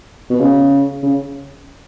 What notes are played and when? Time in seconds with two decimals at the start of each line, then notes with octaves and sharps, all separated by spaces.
0.30 B2
0.40 C#3
1.02 C#3